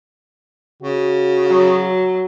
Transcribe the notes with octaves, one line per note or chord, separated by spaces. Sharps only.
C#3 F#4
F#3